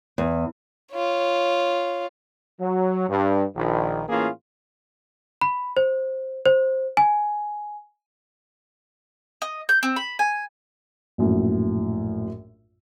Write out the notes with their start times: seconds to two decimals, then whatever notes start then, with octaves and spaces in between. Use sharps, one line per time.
0.18 E2
0.92 F4 C#5
2.61 F#3
3.09 G2
3.56 A#1 D#3
4.09 A2 E3 A#3 C#4 F4 G#4
5.41 B5
5.77 C5
6.46 C5
6.97 G#5
9.42 D#5
9.69 G6
9.83 C4
9.96 B5
10.19 G#5
11.18 A#1 F#2 A2